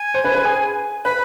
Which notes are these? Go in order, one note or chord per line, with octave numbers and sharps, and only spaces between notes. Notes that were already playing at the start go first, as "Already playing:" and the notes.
Already playing: G#5
C5
B4
B4
G#4
B4 B5